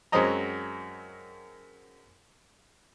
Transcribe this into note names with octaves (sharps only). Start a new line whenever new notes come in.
F#2 F#3 G#3 C4 D#5 A#5